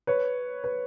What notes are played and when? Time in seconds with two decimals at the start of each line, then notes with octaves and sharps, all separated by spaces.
0.07 B4 C#5
0.64 B4